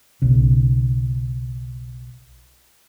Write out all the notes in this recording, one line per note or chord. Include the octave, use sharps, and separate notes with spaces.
B1 C#3